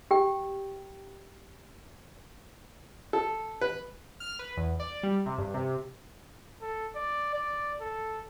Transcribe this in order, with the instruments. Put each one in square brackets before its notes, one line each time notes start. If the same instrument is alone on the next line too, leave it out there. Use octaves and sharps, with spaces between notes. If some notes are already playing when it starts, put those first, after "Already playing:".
[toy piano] G4 G5
[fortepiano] A4
B4
[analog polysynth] F6
B4
E2
D5
G3
C3
G2
C3
[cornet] A4
D5
D5
A4